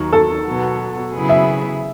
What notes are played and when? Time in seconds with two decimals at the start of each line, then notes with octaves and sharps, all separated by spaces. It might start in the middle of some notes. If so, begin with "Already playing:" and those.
Already playing: D#2 D#3 F#3
0.13 A4
0.46 B2 F#3 B3
1.13 C#3 F#3 B3 E4 G#4
1.29 E5